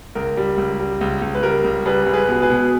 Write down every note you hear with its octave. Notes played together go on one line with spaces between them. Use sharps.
C#2 A#4
G3
C#2
G3
C#2
C#2
B4
G3 A#4
C#2
G3 G#4 B4
C#2
G#4 B4
B2
G#4 B4
B2